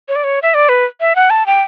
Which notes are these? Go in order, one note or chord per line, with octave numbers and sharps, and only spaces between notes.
C#5
D5
C#5
E5
D5
B4
E5
F#5
A5
G5